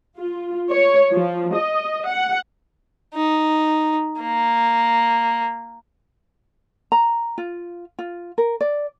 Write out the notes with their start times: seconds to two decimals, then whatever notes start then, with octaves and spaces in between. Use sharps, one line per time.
0.18 F4
0.72 C#5
1.12 F3
1.55 D#5
2.07 F#5
3.15 D#4
4.20 A#3
6.92 A#5
7.38 F4
7.99 F4
8.38 A#4
8.61 D5